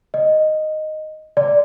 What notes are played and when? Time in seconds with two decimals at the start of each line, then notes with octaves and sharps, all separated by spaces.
0.14 D#5
1.37 D5